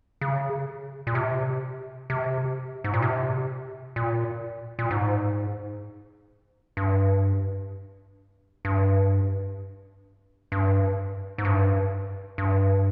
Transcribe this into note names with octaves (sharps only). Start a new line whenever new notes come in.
C#3
A#2
C3
C3
G#2
A#2
C3
A#2
A#2
G#2
G2
G2
G2
G#2
G2
G2